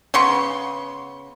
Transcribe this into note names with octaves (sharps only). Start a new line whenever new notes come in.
C#3 B3 C6 C#6